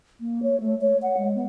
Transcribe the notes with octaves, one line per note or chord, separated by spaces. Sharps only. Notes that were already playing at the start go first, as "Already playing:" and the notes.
A#3
C#5
A3
C#5
F#5
G#3
B3